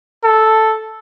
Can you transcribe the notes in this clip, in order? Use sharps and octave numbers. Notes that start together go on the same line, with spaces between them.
A4